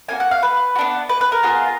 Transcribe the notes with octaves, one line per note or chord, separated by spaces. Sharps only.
A#3 D#4 F#4 G#5
F#5
F5
B4
F#4
B3 D4
B4
B4
A#4
B3 F4 G#4